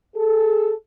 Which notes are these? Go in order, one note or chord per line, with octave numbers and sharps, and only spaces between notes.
G#4 A4